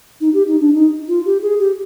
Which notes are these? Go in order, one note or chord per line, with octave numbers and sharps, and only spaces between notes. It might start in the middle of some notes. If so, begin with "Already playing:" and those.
D#4
G4
D#4
D4
D#4
F4
G4
G#4
G4